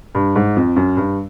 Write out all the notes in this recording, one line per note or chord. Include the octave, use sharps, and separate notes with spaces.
G2
G#2
F2
F#2
G2